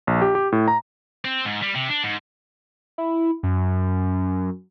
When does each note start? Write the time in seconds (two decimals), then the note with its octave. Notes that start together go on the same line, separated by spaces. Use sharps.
0.07 A#1
0.21 G4
0.35 G4
0.52 A2
0.68 A#5
1.25 C4
1.45 G#2
1.62 G3
1.75 C3
1.89 D4
2.04 G#2
2.98 E4
3.43 F#2